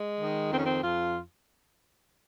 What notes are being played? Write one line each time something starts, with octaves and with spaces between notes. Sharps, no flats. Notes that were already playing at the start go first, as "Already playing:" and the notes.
Already playing: G#3
D#3
F2 C4
C#4
C4
F2 F4